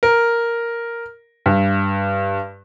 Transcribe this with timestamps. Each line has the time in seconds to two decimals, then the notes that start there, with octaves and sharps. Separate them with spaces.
0.03 A#4
1.46 G2